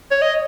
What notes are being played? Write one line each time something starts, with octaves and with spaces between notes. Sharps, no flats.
C#5
D#5